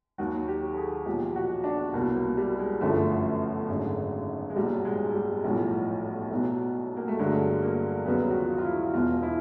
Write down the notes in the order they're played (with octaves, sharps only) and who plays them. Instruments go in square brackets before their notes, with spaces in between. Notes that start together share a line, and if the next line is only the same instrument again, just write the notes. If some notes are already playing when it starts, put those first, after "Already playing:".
[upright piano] D#2 D#3 F#3 F#4
G4
A4
G#4
B1 A#2 F3 G4
F#4
D4
C2 B2 F#3 A#3
A#3
G3
G#3
G1 F#2 D3 F3 A3
G#1 F#2 D3 G#3
G#3
B1 A#2 F#3 G3
G#3
G3
B1 A2 F3
B1 B2 F#3
A#3
A3
G1 G2 D3 F#3 G#3
A#3
D#2 C#3 F#3 B3
F#4
F4
F4
E4
E1 E2 B2 F4
E4